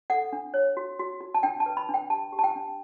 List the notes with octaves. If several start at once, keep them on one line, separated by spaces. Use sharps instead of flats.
A4 F#5
D4
C#5
F#4
F#4
F#4
A5
D4 G5
A5
B4
B5
D4
G5
G4 A5
G4
A5
G5
D4